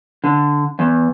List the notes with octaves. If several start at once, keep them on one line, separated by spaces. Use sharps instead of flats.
D3
E2